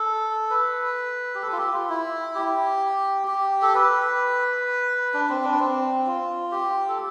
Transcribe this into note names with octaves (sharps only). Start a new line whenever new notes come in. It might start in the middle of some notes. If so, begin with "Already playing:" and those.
Already playing: A4
B4
G4
A4
F4
G4
F4
E4
G4
G4
A4
B4
D4
C4
D4
C4
F4
G4
A4